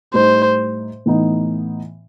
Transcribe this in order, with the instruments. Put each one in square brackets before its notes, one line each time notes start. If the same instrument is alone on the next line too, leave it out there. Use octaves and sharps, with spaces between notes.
[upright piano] A2 G3 D#4 [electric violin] C5
[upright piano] A2 E3 B3 D#4